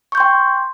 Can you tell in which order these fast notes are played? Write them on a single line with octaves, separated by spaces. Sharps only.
C#6 G6 C6 G5